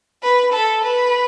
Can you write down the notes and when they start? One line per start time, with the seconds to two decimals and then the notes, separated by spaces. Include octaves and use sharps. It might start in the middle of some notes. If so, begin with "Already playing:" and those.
0.23 B4
0.53 A4
0.83 B4